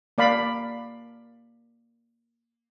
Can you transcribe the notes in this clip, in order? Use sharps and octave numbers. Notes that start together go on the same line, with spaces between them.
A#3 D5 F5 B5